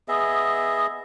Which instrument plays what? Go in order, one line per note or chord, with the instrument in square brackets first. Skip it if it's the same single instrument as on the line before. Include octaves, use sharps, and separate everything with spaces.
[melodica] B3 G#4 D#5 E5